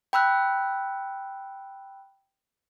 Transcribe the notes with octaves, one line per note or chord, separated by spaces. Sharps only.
G5 B5 E6 F#6